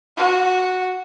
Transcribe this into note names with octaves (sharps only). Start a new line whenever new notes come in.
F#4